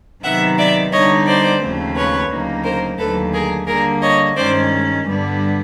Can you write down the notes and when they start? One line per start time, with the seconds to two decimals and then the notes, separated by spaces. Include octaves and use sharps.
0.24 C3 D#3 F#3 B3 D#4 E5 F#5
0.58 D5 E5
0.92 D3 G3 B3 D#4 C#5 D#5
1.27 C5 D5
1.61 D#2 C#3 F3 A3 C4
1.96 B4 C#5
2.30 D2 C#3 F#3 A#3 D#4
2.64 A#4 C5
2.99 D#2 D3 F#3 A3 A4 B4
3.33 G#4 A#4
3.67 D3 G3 A#3 G#4 A#4
4.02 C#5 D#5
4.36 G2 D#3 G#3 C#4 C5 D5
5.05 G2 D3 G3 B3